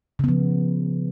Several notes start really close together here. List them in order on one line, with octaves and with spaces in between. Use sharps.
C#3 B3 F3